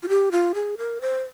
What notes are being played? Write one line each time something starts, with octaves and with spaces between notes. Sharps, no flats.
F4
G4
F4
G#4
A#4
C5